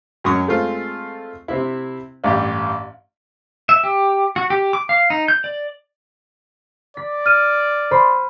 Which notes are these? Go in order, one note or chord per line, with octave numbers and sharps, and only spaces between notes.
F#2 F#3 C#4 C#6 D#6
G#3 A3 C4 F4
C3 C4 E4
A1 G2 G4
E5
G4
F#4
G4
D6
F5
D#4
G6
D5
D5 B6
F6 D#7
C5 B5